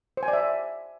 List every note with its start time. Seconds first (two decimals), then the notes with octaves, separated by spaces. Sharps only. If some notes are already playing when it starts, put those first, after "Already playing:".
0.17 C5
0.23 G#5
0.28 D5
0.33 E5